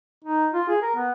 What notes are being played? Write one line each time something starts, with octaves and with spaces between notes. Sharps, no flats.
D#4
F4
G#4
A#4
B3